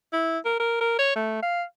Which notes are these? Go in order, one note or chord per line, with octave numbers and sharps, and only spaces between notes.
E4
A#4
A#4
A#4
C#5
A3
F5